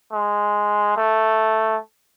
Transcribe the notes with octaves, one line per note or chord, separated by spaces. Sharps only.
G#3
A3